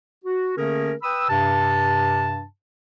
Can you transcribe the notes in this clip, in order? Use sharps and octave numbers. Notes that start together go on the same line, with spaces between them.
F#4
D3 A3 A#3 C#4 G#4 A#4
B4 G5 B5 D#6 E6
G2 C3 A5